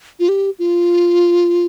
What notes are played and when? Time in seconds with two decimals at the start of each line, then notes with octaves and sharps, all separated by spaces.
0.20 F4
0.29 G4
0.59 F4